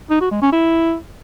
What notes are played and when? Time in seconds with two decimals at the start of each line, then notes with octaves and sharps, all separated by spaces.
0.10 D#4
0.21 F#4
0.31 G#3
0.42 C#4
0.52 E4